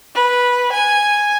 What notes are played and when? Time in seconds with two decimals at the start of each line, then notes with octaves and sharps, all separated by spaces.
0.14 B4
0.72 G#5